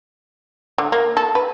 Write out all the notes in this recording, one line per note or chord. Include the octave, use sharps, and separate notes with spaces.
D3
A#3
A4
B4